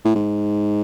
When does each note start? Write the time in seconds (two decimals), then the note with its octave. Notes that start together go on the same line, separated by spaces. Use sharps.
0.05 A2
0.15 G#2